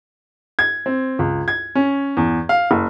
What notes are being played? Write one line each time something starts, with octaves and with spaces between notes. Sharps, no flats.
G#6
C4
C#2
G#6
C#4
E2
F5
F#1